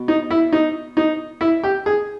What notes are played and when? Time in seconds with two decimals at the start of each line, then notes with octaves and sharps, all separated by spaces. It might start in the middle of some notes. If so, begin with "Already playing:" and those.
Already playing: B2
0.08 D#4
0.30 E4
0.52 D#4
0.97 D#4
1.41 E4
1.64 G4
1.86 G#4